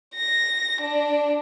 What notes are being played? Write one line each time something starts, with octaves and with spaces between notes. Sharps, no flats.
A#6
D4